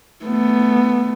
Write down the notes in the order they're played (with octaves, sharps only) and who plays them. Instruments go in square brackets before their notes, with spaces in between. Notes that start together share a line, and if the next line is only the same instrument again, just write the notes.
[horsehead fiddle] A3 B3